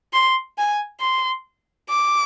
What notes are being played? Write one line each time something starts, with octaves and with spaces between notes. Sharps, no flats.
C6
G#5
C6
D6